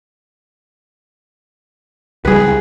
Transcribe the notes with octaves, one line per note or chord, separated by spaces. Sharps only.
C#2 G3 G#4 B4